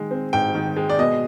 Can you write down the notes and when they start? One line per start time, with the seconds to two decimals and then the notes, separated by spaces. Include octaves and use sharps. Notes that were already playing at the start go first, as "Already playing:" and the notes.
Already playing: D#3 G#3
0.11 C4
0.33 G#2 G5
0.54 D#3
0.77 G#3
0.89 D5
0.99 B2 D#5